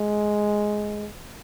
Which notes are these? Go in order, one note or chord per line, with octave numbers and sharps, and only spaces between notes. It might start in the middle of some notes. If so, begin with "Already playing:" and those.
Already playing: G#3